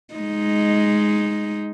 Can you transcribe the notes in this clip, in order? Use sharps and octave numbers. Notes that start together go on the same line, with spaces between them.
G#3 D#4